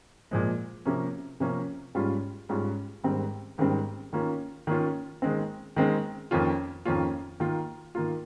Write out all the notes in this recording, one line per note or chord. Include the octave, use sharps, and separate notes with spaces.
A#2 F3 G#3
C3 F3 A#3 C#4
C3 F3 A#3 C#4
G#2 G3 C#4 F4
G#2 G3 C#4 F4
G#2 D#3 G3 C4
G#2 D#3 G3 C4
D#3 A#3 C#4 F4
D#3 A#3 C#4 F4
D#3 G#3 C4
D#3 G#3 C4
F2 D#3 A#3 C#4 F4
F2 D#3 A#3 C#4 F4
D#3 A#3 F4
D#3 A#3 F4